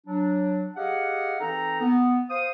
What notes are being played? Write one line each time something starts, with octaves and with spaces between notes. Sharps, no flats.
F#3 D4
G4 G#4 D#5 F5 F#5
E3 C4 D#4 A4 A#5
B3
C5 F5 D#6